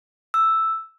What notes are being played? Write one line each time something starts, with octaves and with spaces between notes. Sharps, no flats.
E6